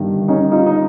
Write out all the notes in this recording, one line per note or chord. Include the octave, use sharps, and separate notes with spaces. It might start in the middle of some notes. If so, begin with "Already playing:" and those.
Already playing: G1 G2 D#3
C#4 D#4
D#4 F4
D#4